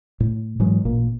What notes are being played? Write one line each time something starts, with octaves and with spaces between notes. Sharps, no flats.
A2
G#2 E3 F#3 G#3
A1 A#2 A#3